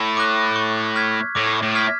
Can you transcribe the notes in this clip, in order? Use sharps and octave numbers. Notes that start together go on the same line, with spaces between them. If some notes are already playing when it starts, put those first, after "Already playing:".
Already playing: A2
D6 F#6
C#6
F6 G#6 B6
A2 D6
A2
F6 G#6 B6